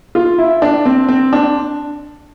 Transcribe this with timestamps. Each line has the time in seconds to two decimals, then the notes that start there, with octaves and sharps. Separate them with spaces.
0.15 F4
0.38 E4
0.62 D4
0.86 C4
1.09 C4
1.33 D4